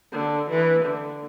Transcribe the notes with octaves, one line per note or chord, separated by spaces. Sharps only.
D3
E3
D3